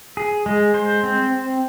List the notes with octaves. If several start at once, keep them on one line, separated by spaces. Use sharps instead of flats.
G#4
G#3
C5
C4